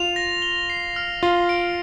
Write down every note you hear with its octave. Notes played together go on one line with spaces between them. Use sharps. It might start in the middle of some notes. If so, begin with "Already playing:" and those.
Already playing: F4 F7
A#6
G7
C7
F6
F4 G7
D7